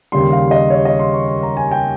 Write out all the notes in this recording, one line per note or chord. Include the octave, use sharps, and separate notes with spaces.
D#2 C#3 G3 C6
F5
D#5
C#5
D#5
C6
C#6
C6
A#5
G#5
G5